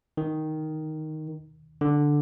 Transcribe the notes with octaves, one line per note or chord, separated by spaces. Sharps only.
D#3
D3